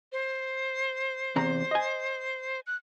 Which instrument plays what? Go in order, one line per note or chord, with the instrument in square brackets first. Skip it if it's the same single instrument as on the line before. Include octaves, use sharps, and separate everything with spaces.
[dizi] C5
[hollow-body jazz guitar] E2 C3 A#5
D#5 G#5
[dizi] F#6